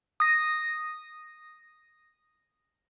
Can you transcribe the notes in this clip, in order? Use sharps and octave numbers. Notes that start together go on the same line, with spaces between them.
D#6 A#6